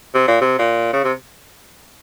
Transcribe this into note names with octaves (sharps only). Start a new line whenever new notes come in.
C3
A#2
C3
A#2
C#3
C3